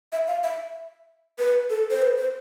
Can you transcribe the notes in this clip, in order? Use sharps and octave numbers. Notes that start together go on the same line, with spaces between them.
E5
F5
E5
B4
A4
C5
B4
C5